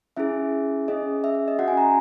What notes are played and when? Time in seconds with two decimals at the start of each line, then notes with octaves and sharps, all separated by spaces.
0.17 C#4 E4 G#4 E5
0.88 C#4 G#4 D#5
1.24 E5
1.35 E5
1.48 D#5
1.59 C#4 F#4 F#5
1.68 G#5
1.78 A#5